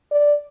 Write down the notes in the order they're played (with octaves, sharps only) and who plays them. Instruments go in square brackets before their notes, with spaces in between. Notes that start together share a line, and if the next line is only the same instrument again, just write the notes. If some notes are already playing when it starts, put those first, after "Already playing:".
[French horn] D5